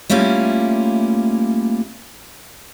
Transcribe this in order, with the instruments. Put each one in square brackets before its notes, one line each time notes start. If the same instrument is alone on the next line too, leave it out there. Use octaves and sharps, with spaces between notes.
[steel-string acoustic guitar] G3 A3 A#3 C#4 E4 F4